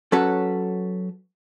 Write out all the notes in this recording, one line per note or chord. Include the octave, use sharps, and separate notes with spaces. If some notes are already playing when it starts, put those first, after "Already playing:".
F#3 C#4 F#4 A4 B4